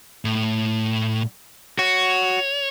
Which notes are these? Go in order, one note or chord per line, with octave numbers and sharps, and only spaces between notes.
A2
F#4 C#5